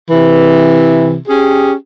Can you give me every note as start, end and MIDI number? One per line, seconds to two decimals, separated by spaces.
0.10 1.16 48
0.10 1.16 52
1.28 1.72 61
1.28 1.72 67
1.28 1.72 68